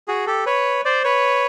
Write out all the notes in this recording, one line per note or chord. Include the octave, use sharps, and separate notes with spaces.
F#4 G#4
G4 A4
B4 C#5
C5 D5
B4 C#5